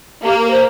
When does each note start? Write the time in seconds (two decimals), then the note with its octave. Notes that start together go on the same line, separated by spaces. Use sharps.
0.23 A#3 G4
0.37 A#4
0.50 C5